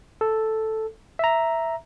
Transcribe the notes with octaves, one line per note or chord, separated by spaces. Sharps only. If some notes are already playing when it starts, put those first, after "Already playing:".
A4
E5 A#5